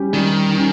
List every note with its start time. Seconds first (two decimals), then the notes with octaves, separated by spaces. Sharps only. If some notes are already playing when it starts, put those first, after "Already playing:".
Already playing: G3 C#4 G4
0.13 D#3 G3
0.57 C#4